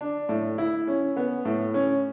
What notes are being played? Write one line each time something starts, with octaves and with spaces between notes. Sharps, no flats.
D4
A2
E4
C#4
B3
A2
C#4